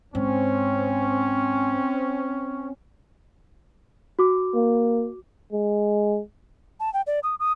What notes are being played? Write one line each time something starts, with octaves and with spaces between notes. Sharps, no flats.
G#2 C4 C#4
F#4 D6
A#3
G#3
A5
G5
D5
D#6
D#6